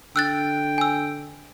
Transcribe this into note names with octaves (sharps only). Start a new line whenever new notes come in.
D3 G5 E6 F#6 A6
G#5 E6